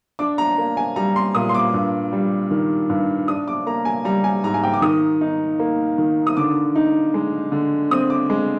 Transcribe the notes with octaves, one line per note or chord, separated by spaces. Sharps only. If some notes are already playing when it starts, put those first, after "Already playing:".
D4 D6
A#5
A#3
G#5
G3 A#5
C6
A#2 D#6
C6
D6
G2
G3
D#3
G2
D4 D#6
D6
A#3 A#5
G#5
G3 A#5
G#5
G#2 A#5
G#5
G5
D6
D#3 D#6
D#4
A#3
D#3
D#6
D3 D6
D#4
G#3
D3
C4 D#6
D6
G#3